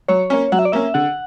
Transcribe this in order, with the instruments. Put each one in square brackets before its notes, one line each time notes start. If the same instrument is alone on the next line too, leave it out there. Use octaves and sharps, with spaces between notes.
[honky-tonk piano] F#3 [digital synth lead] C#5
[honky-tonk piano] A#3 C#4
[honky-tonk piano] F#3 [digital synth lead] F#5
[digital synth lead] E5
D5
[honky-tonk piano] A#3 C#4 [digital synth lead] E5
[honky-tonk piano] D3 [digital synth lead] F#5